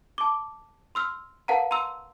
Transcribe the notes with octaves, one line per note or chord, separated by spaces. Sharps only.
A5 D6
C6 E6 F6
A#4 B4 F5 F#5 A5 A#5
A#5 C6 E6